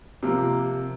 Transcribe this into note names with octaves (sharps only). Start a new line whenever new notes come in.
C3 F3 A#3